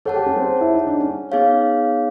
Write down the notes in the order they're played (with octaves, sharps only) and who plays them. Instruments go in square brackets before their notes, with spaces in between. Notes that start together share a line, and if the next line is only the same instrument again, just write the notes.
[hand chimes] G#4 C#5 F#5 A5 [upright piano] A4
[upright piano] G4
C#4
C4
E4
D#4
D4
C#4
[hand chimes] B3 D#4 G#4 C#5 F5